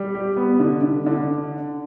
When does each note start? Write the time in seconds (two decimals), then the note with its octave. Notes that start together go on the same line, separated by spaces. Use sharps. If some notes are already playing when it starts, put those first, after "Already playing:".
Already playing: G3
0.15 G4
0.37 B3
0.60 D3
0.83 D3
1.06 D3